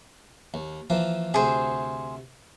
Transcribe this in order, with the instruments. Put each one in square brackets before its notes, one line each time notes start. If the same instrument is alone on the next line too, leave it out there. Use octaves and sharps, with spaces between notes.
[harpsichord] D#2
E3 F3 A#3
[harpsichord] D2 C3 [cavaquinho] G#4 C5